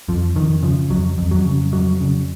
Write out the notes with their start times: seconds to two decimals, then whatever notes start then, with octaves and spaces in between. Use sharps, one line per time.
0.08 F2 F3
0.35 F2 D#3
0.63 C#3 F3
0.90 F2 F#3
1.18 F2
1.31 F#3
1.45 C#3
1.72 F2 F#3
2.00 C#3